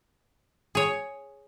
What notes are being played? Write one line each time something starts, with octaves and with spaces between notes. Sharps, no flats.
G#4 C#5